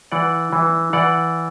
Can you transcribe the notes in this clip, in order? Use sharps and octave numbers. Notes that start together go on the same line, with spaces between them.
E3 D5 F#5
E3
E3 D5 F#5